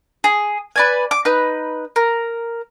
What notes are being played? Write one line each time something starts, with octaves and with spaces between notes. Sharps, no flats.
G#4
B4 D5 G#5
D6
D#4 B4
A#4